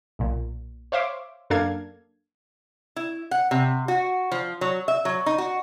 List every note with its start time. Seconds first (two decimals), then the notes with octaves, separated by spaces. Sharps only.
0.19 B1 A#2
0.92 C5 C#5 E5 F5 C6 D6
1.50 F#2 A#3 D4 A4 F5 G#6
2.96 E4
3.31 F#5
3.51 C3
3.88 F#4
4.32 F3
4.61 F#3
4.88 E5
5.05 F#3
5.26 D#4
5.38 F#4